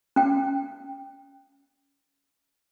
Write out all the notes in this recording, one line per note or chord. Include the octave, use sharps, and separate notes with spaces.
C#4 G5